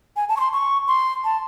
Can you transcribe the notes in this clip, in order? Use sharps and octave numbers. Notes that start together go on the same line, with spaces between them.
G#5
A5
C#6
C6
C#6
C6
A5